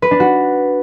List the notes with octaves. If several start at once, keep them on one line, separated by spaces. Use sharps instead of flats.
B4
D4
F#4